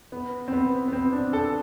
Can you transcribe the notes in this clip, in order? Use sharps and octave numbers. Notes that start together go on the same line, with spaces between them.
B3
C4
B3
B3
C4
D4
A4